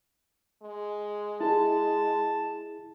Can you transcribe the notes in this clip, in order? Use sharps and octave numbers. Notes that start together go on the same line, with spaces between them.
G#3
E4 G#4 A5